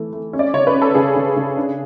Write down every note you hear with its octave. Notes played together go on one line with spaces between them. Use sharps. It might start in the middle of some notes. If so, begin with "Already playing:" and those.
Already playing: E3 A3
A3
C#4
D5
C#3 C#5
B4
C#4
A4
C#3 G#4
C#3
C#3
D4